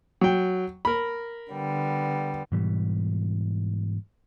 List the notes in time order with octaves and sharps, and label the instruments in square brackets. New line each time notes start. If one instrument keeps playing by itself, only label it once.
[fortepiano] F#3 G5
A#4 B5
[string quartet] D3 G3 B3
[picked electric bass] G#2 B2 E3 G3